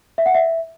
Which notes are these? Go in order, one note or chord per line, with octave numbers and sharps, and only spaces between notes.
E5
F#5
E5